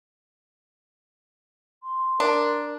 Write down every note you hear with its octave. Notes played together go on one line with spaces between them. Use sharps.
C6
D4 A#4